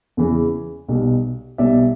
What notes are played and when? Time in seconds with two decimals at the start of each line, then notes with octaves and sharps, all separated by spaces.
0.17 E2 C#3 E3
0.88 B1 B2 G3
1.58 B1 B2 G3 D5 E5